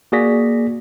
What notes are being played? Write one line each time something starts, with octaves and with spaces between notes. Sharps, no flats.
A#3 F#4 G#4 D5 A#6 B6